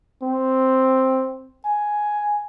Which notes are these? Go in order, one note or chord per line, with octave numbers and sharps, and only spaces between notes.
C4
G#5